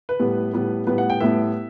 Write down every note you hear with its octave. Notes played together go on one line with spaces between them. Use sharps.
B4
A2 G3 B3
A2 G3 B3
A2 G3 B3 B4
F#5
G5
A2 G3 B3 E5